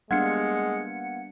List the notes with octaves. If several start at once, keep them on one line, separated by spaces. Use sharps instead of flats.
G3 G#3 A#3 B3 D4 F#5 G#6 C#7